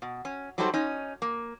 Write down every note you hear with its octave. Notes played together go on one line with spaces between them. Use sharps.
B2
C#4
F#3 G3 D#4 F#4 A4 C5
C#4 D#4
A#3